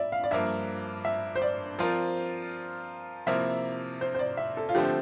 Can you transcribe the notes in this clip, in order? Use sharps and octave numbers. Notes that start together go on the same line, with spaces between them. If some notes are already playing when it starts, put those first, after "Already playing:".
Already playing: D5 E5
F5
D5
G2 F3 A#3 E5
E5
C5
D5
F3 C4 F4 A#4
C3 F3 A#3 E4 E5
C5
C5
D5
E5
A4
F4
D3 F3 A3 C4 G4